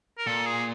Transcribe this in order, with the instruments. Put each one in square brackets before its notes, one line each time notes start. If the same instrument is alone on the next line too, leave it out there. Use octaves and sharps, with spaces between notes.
[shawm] A#4
[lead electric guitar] A#2 [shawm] A4
[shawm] G#4